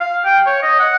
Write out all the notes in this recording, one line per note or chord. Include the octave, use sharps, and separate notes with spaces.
F5
G5
C#5
D#5
F#5